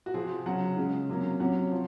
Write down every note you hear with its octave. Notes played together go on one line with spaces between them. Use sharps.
F#4
C3 F3 C4 G#4
C#3 F#3 C#4 F#5
C#3 G#3 C#4
C3 F#3 A#3 C#4
C3 F#3 C#4 F#5
F3